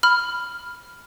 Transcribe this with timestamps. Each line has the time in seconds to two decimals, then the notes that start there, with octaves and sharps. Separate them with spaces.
0.03 B5 F6